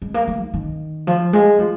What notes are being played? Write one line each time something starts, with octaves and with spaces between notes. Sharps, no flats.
G#3
A#3
A#3
D#3
D#3
F3
G#3
F3